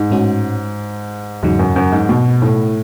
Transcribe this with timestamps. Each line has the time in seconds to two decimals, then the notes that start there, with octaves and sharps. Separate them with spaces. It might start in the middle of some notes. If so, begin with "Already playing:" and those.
Already playing: G#2
0.10 A2 G#3 C#4 F#4
1.43 E2 G#2 C#3 F#3
1.59 F#2
1.76 F#2
1.92 G#2
2.09 B2
2.42 A2